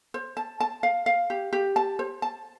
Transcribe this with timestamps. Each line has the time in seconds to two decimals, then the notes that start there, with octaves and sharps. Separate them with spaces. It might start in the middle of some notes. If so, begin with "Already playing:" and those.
0.14 C5
0.37 A5
0.60 A5
0.83 F5
1.06 F5
1.30 G4
1.53 G4
1.76 A5
1.99 C5
2.22 A5